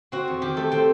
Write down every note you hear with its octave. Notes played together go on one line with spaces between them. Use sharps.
C4 F#4
E2
D#3 G4
A3 A4
C4 G5